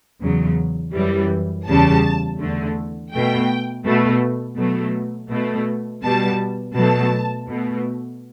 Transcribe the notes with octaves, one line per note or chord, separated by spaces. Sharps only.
E2 C#3 F#3
F#2 E3 G3
E2 C#3 G3 A5
E2 D3 A3
B2 A3 G5
B2 A3
B2 F#3 A3
B2 A3
B2 G3 A5
B2 F#3 A3 A5
B2 A3